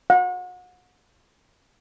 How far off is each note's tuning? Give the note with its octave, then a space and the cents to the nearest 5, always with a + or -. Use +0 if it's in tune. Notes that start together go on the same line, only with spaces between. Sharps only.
F#5 -35